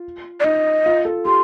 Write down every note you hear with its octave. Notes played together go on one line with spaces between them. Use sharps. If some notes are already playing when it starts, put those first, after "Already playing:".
Already playing: F4
D5
D#4 D#5
F4
A4
G4 C6